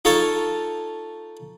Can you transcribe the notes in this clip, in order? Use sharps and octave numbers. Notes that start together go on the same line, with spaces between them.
D#4 F4 A4 C#5 A5 C#6